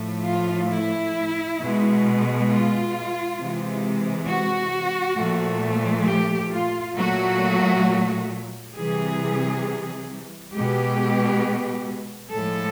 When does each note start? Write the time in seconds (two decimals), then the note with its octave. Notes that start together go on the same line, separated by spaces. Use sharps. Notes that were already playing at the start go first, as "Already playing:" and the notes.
Already playing: A2 F3 A3
0.25 F4
0.70 E4
1.60 B2 G#3
2.49 F4
3.38 C3 E3 G#3
4.28 F#4
5.17 A#2 F3 A3
6.07 G4
6.52 F4
6.96 A#2 F#3 A3 F#4
8.75 C3 E3 G3 G#4
10.54 B2 G#3 G4
12.33 A2 F3 G#3 A4